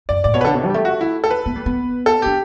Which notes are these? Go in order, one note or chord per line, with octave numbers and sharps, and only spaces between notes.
F#2 D5
A2 D5
B2 C#5
B4
D3 A4
B2
G3
A3 G4
F#4
E4
A4
B4
B3
G3
B3
A4
D4 G4